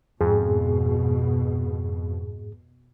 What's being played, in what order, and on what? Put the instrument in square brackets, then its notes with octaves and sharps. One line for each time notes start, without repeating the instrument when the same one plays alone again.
[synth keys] F2 [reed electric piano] G#2 G#4 [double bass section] B2